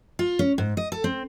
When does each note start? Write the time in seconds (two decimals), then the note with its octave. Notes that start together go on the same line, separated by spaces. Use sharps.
0.19 F4
0.39 C#4
0.58 G#2
0.77 D#5
0.92 A4
1.04 C4